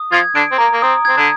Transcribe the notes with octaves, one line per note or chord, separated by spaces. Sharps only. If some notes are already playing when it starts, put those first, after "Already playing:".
Already playing: D#6
F3 F4 G#6
D3 D4 D7
C4
A#3 A#5
A#3
C4 D#6
C4 G#6
D3 D4